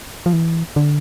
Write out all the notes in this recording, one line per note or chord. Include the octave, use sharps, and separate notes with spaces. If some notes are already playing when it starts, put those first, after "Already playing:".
F3
E3
D3